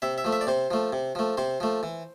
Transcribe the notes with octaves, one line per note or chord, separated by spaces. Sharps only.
C3 E5
E5
F3 A3
E5
D5
C3 C5
F3 A3
C3
F3 A3
C3 C5
F3 A3
E3